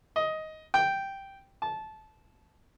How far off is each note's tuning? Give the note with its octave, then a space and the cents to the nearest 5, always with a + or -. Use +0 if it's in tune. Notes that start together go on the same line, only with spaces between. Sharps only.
D#5 +10
G5 -5
A5 -20